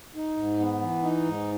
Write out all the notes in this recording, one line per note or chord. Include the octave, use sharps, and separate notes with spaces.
D#4
G#2
B3
E3
D#4
G#2